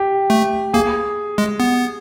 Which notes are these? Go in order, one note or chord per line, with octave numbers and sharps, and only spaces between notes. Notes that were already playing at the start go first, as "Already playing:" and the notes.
Already playing: G4
A3
A#3 G#4
G#3
B3